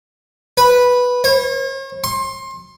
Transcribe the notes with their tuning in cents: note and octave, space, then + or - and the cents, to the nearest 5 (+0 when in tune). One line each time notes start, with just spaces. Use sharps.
B4 -5
C#5 -45
C6 +25